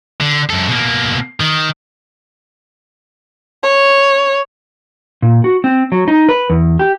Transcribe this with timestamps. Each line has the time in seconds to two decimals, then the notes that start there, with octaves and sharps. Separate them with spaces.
0.21 D3
0.50 F#2 A4
0.69 B2 A#3
1.40 D#3
3.63 C#5
5.22 A#2
5.44 F#4
5.64 C4
5.92 F#3
6.08 D#4
6.29 B4
6.50 E2
6.79 G4